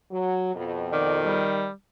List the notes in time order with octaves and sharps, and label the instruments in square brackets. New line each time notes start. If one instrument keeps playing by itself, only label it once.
[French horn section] F#3
F2 B2
[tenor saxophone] D#3 [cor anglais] D5
[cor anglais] G3